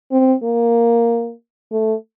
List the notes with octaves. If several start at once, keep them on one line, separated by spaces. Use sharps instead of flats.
C4
A#3
A3